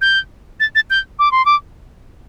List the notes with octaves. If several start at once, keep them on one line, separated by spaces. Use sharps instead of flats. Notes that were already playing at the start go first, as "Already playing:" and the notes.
G6
A6
A6
G6
D6
C6
D6